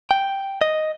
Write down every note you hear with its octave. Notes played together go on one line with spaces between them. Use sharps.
G5
D#5